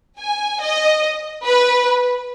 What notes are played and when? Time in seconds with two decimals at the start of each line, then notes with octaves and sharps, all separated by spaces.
0.19 G#5
0.61 D#5
1.44 B4